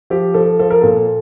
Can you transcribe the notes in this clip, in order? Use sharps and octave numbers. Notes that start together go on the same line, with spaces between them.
F3 G4
F3 A4
F3 A4
A#4
A#2 A4